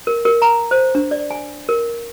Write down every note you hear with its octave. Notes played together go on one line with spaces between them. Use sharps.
A#4
A#4
A#5
C5
D4
D5
G#5
A#4